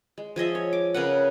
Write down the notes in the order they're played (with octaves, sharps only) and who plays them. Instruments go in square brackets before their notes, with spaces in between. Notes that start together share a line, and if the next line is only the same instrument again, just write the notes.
[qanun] G#3
F3 G#4 D#5 E5
C#5
D6
C#3 A#4 B4 F#5